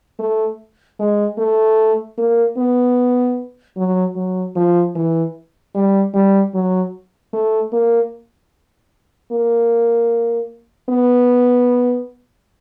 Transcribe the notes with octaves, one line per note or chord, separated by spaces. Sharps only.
A3
G#3
A3
A#3
B3
F#3
F#3
F3
E3
G3
G3
F#3
A3
A#3
A#3
B3